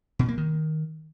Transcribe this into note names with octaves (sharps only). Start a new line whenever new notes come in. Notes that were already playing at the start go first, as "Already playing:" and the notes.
B2
A#3
D#3